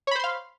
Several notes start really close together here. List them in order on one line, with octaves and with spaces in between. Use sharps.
C#5 B5 C5 C6 F5